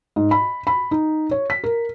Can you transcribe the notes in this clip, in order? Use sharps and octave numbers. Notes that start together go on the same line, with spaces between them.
G#2
B5
B5
D#4
C#5
B6
A#4